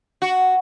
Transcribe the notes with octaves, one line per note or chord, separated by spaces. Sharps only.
F#4